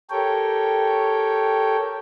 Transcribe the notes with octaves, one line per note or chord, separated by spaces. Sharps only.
G4 A4 A#4 C#5 G5